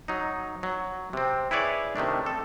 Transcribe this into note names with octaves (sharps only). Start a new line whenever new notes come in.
F#3 D#4
F#3
C3 C4
E4 G#4 B4 C#5 D5
C3 D#3 A3 D4
A4